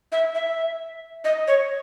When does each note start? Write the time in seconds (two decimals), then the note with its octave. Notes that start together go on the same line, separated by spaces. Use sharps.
0.12 E5
0.35 E5
1.24 D#5
1.48 C#5